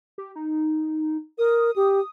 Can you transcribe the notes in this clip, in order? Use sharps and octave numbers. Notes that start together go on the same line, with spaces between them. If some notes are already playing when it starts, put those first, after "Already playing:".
G4
D#4
A#4 D#6
G4